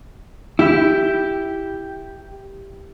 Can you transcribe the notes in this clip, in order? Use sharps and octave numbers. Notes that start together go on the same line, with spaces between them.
E4 G4